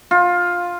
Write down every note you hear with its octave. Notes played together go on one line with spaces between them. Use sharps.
F4